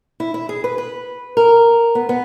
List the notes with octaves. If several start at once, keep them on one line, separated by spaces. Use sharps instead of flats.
E4
E4
G#4
B4
B4
A#4
B3
B3